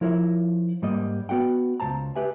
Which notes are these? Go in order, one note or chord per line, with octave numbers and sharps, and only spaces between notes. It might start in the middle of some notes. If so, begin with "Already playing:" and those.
F3 E4 A#4 C#5 E5
G#2 G3 A#3 D#5
B3 F#4 D5 F#5 G5
C#2 D#3 C5 A5 A#5
G4 B4 E5 G#5